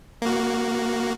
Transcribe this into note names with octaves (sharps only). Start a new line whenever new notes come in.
A#3 F#4